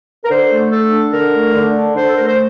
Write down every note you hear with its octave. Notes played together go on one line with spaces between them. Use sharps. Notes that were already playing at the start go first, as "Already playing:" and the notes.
A#4
D3 C5
A3
D3 A4
D4
D3 A#4
A3
D3
D4
D3 C5
A4
A3 A#4
C5